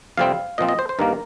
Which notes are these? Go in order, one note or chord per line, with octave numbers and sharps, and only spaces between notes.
F2 C3 G3 C4 F5
A#2 F3 C4 D#5
D#5
C5
C5
G2 D#3 A#3 A#4